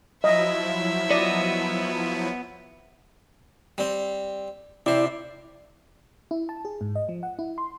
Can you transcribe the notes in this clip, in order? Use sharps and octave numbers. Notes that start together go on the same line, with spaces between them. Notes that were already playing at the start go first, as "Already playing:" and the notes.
F3 F#3 E4 D#5 E5
B3 D5 D#5
G3 C4
C3 E4 C5 D5
E4
A5
G#4
G#2
D#5
F3
F#5
E4
C6